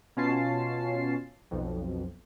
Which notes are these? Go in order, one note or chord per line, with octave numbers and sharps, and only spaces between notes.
B2 C#4 F4 A5 C7
B1 F2